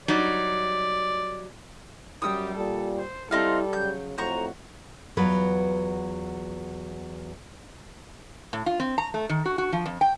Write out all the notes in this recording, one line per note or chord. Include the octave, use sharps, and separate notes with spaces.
F#3 G3 D#4 D5
F#2 G3 G4 D#6 E6
A#2 G3 A4
C5
G3 C4 D#4 E4 A4 F5
C#3 F#3 G6
F2 A2 F#4 C5 A#5 C#6
E2 F#3 F4 B4
A2
F4
C4
A#5
A3
D#3
F#4
F#4
F3
F2
G5